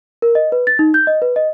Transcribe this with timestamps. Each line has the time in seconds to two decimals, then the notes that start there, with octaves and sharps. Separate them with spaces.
0.22 A#4
0.35 D#5
0.52 B4
0.67 A6
0.79 D#4
0.94 G6
1.07 D#5
1.22 B4
1.36 D#5